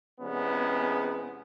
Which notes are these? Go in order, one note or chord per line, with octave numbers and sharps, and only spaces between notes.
E2 C3 G#3 B3 C#4